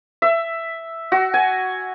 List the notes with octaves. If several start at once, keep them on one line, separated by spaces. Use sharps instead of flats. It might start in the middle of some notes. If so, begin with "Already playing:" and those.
E5
F#4
G#5